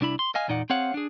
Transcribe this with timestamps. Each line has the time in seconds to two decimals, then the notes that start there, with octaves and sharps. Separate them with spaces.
0.01 C2 D4 E4 B5
0.19 C6
0.35 D#5 F5 G#5
0.48 E2 A#2 D#4 D5 F#5
0.70 C4 G#4 C#5 F5 F#5
0.94 D4 G#4